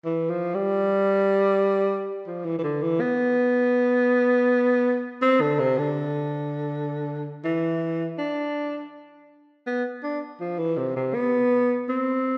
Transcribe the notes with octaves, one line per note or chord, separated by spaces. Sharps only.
E3
F3
G3
F3
E3
E3
D3
E3
B3
C4
D3
C3
D3
E3
D4
B3
D4
F3
E3
C3
C3
B3
C4